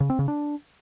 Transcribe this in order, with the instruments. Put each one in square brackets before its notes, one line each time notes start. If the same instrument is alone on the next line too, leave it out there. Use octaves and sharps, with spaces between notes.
[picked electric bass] C#3
C4
C#3
D4